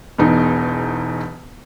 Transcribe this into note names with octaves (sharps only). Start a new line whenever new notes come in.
E1 E2 D#4